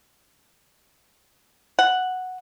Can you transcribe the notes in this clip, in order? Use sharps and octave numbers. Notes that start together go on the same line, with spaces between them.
F#5